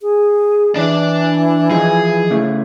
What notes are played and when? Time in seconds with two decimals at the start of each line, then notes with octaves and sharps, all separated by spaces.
0.01 G#4
0.76 E3 D4 D5
1.71 F3 G#4 D#5 G#5
2.30 C#3 A3 E4